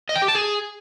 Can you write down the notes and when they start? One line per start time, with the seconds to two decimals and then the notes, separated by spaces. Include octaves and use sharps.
0.09 D#5
0.16 G5
0.22 G4
0.28 A5
0.35 G#4